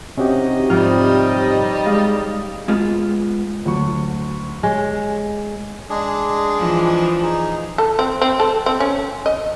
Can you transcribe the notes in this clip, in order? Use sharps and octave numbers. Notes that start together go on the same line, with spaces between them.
C3 C#4 D#4 F#4 G4 C#5 D#5
G#2 F3 G3 F6
G#3 F5 D#6
G#3 A#3 B3 F4 G#4
D2 F#3 C#6
G#3 C#5
G#3 D4 G#4
E3 F3
D#4 G#4
A4
C4
C4
A4
C4
C#4
D#5